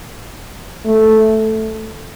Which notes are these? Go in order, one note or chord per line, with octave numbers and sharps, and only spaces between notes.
A3